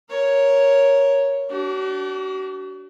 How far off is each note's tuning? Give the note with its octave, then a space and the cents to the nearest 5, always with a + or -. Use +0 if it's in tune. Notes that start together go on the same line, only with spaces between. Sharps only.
A#4 +0 C#5 +0
D4 -25 F#4 +40